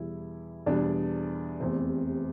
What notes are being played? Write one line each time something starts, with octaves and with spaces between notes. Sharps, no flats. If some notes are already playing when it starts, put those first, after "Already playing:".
Already playing: E2 B2 G3 E4
E2 B2 G3 D4 D5
F1 E2 C3 C4 C5